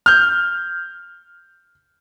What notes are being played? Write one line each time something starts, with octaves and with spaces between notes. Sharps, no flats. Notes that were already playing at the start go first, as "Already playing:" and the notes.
F6 G6